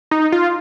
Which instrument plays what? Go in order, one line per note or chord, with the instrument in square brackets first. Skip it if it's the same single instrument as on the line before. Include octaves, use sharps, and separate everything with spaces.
[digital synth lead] D#4
F4